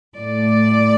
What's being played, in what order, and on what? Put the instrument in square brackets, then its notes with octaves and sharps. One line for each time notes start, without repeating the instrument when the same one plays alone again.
[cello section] A2 A3 D5